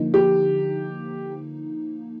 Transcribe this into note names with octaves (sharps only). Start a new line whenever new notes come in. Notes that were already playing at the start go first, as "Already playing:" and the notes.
Already playing: D3 F3 A#3 D#4
G4